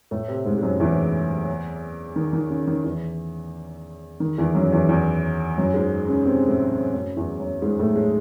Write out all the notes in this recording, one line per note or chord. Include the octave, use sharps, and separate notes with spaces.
A2 A3
C3 C4
G#2 G#3
G#3
F#2 F#3
E2 E3
D#3
D#3
C#3
D#3
E2 E3
D#3
E2 E3
F#2 F#3
E2 E3
E2 E3
F#2 F#3
G#2 G#3
C#3 C#4
C3 C4
A2 A3
F#2 F#3
E2 E3
F#2 F#3
G#2 G#3
A2 A3
G#3